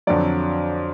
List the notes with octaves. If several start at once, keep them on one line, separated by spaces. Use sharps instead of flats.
F2 D3 F#3 D5